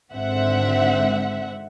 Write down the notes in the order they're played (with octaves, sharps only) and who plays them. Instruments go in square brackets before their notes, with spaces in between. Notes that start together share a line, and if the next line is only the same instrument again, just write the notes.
[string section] G#1 G#2 D3 C4 E5 F#5